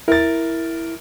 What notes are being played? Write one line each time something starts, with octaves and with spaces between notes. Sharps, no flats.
E4 A#4 A6